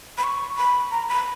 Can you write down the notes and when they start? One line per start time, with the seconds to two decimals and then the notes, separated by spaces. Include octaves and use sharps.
0.18 B5
0.24 C#6
0.57 B5
0.91 A#5
1.09 B5